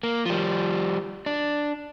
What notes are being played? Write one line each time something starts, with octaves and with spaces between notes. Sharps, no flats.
A#3
F3 G3
D4